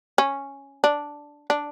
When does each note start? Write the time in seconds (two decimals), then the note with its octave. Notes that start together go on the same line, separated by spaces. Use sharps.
0.18 C#4
0.84 D4
1.50 D4